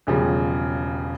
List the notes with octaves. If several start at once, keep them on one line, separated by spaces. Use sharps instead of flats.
E1 C#3 F3 G3